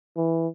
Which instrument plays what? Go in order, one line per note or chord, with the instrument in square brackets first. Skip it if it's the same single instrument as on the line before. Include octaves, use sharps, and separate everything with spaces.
[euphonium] E3